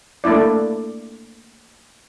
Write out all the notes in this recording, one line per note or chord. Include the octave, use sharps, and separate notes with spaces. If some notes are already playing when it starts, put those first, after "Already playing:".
A3 A#3 D4 E4 D5